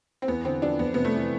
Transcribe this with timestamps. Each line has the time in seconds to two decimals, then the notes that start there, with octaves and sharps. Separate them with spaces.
0.22 C4
0.27 E2 B3
0.45 D3 C4
0.62 F3 D4
0.79 F2 B3
0.94 C3 B3
1.05 A3
1.14 E3